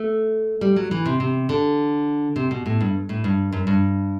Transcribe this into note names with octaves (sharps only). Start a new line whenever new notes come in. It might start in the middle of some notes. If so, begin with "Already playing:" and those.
Already playing: A3
G3
F#3
E3
C3
C3
D3
C3
B2
A2
G2
A2
G2
F#2
G2